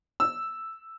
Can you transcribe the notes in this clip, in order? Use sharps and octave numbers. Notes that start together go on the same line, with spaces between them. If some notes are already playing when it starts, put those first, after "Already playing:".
E6